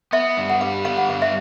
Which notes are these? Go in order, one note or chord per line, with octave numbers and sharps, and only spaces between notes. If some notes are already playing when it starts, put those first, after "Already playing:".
B3 E5
G2
F#5
G3 F5
B3 F5
F#5
G2 F5
E5